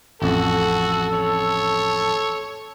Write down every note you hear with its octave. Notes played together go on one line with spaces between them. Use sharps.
A1 F2 F#4 A4
C#5